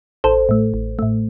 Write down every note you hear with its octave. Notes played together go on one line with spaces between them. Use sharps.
A1 A4 C5
A2 A3
A1
A2 A3